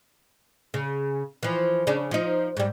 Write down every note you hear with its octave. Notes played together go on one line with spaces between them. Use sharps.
C#3
E3 F3
C#3 C#4 D4
F3 D#4
G#2 G3